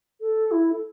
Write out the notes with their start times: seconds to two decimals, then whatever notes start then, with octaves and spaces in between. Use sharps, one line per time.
0.21 A4
0.51 E4
0.72 A4